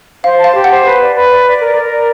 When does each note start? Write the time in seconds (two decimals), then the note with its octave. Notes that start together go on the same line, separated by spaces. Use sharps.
0.24 C5 F5
0.39 A5
0.44 F5
0.55 G4
0.64 F#5
0.70 C5
0.85 B4
1.00 D5
1.15 B4
1.31 D5
1.46 D5
1.61 A#4
1.76 A#4
1.91 D5